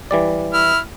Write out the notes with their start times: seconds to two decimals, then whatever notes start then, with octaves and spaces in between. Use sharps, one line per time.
0.11 E3 G3 D5
0.53 E4 F6